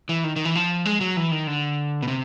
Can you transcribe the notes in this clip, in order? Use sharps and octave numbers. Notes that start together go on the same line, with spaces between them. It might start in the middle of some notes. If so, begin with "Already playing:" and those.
E3
D#3
D#3
E3
F3
G#3
F#3
E3
D#3
D3
B2
C3